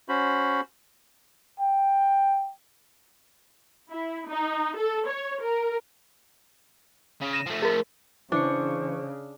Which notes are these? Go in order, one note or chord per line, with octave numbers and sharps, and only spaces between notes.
C#4 F#4 C5 B5
G5
E4
D#4
A4
C#5
A#4
C#3
A#6 D#7 E7
F3 A3
G#4 A#4
C#3 E3 D4 C5 C#6